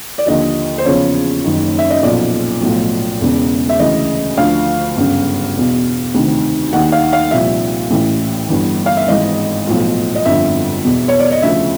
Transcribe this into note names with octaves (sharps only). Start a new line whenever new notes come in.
D5
D#2 D3 F3 D#5
C5
E2 C#3 F3 C#5
F#1 F#2 D#3
E5
D#5
B1 A#2 F3 D5
B1 A2 F3
E1 E2 C#3
E5
D2 C#3 E3 D#5
D2 D3 F3 F5
G1 F#2 C#3
E2 B2
D2 C3 D#3
D#2 D#3 F#5
F5
F5
C2 A#2 F3 E5
A1 A2 E3
G1 G2 E3
F5
E5
G#1 G#2 E3 D#5
B1 A2 F3
D#5
G1 F2 D3 F3 E5
E2 B2
C#5
D5
D#5
D2 C#3 F3 E5